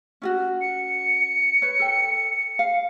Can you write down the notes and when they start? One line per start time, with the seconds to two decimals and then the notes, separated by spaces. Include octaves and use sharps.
0.22 C#4 F4 F#4
0.61 C#7
1.62 B4 C#5
1.80 A4 G5
2.59 F5